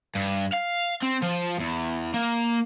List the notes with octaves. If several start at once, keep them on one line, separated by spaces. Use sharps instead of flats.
G2
F5
C4
F3
E2
A#3